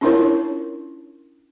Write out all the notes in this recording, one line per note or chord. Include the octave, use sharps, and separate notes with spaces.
C#4 D4 E4 F4 A#4 C#5